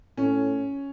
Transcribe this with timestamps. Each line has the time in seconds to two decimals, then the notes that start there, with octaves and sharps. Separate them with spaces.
0.17 A2 C#4